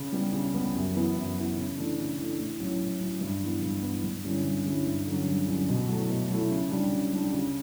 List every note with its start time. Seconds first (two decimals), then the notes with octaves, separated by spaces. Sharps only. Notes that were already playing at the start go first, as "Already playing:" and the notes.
Already playing: C#3
0.12 G3 B3
0.33 C#3
0.54 G3 B3
0.75 F#2
0.94 E3 B3 E4
1.16 F#2
1.36 E3 B3 E4
1.57 C#3
1.78 E3 A3 D4
1.98 C#3
2.18 E3 A3 D4
2.40 A2
2.60 F#3 C#4 E4
2.80 A2
3.00 F#3 C#4 E4
3.21 G2
3.42 E3 B3
3.62 G2
3.83 E3 B3
4.04 G2
4.24 D3 G3 C#4 E4
4.44 G2
4.65 D3 G3 C#4 E4
4.86 G2
5.07 D3 F#3 C#4
5.27 G2
5.47 D3 F#3 C#4
5.69 B2
5.88 F#3 A3 E4
6.10 B2
6.30 F#3 A3 E4
6.50 C#3
6.71 G3 D4
6.92 C#3
7.13 G3 D4
7.33 C#3